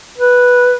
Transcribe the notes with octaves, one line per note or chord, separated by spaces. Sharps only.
B4